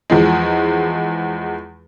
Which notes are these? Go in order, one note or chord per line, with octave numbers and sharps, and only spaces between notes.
E2 F3 G#3